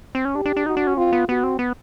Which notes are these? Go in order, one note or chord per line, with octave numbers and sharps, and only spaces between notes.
C4
C#4
D4 G4
D4
D4
D#4 F#4
D4
C#4
C4 F4
B3
B3 F#4
C4
B3